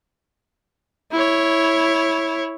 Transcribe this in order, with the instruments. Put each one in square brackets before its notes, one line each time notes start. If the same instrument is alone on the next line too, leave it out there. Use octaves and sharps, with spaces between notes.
[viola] E4 C#5